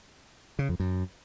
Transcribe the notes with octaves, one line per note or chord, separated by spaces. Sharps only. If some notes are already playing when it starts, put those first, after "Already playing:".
C#3
F2
F#2